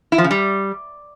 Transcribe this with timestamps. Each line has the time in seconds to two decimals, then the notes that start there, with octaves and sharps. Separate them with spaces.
0.12 E4
0.18 F3
0.24 C#3
0.31 G3